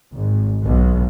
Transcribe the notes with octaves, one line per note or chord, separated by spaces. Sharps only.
G#1
B1